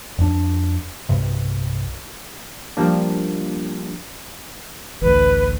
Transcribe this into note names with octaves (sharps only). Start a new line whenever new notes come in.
F2 D4
B1 G2 C3
F3 G3 A#3 D4
A1 D2 B4